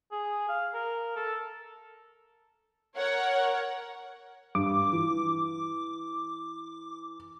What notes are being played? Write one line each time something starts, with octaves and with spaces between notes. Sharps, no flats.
G#4
F5
A#4
A4
A#4 C#5 F#5
G2 D6
E3